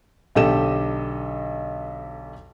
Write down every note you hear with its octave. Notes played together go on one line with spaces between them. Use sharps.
B1 D3 G4 A4 D#5 E7